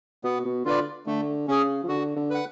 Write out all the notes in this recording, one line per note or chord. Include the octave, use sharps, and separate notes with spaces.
B2 B3
B2
D3 F4 B4 D5
D3 A3
C#3 C#4 G#4
F3
D3 F#4
D3
B4 F#5